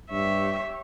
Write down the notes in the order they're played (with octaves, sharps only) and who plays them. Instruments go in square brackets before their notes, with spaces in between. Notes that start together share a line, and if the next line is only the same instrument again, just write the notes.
[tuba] G2 [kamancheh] G4 C#5 [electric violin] E5